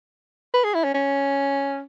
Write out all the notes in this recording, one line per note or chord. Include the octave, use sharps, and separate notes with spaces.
B4
G#4
E4
C#4
C#4